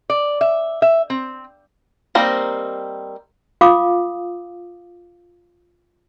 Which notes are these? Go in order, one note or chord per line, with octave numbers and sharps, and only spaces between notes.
D5
E5
E5
C4
G3 A#3 C4 D#4 A#4
F4 F5 D6 D#6